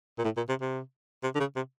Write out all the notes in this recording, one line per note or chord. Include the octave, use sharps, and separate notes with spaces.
A#2
A2
A#2
C3
C3
C3
D3
C#3
C3